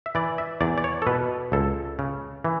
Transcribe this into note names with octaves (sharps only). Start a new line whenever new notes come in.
E5
E3 D5
E5
E2 D5
D5
C#5
A4
B2 B4
C#2 A4
C#3
E3